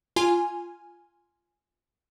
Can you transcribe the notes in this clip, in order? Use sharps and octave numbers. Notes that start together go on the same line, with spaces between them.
F4 G#5